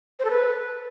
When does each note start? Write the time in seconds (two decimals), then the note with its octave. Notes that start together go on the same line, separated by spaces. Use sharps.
0.19 C5
0.25 A4
0.30 B4